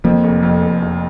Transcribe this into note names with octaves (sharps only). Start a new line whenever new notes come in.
F2 F3 A#3
F1
F2
F1
F1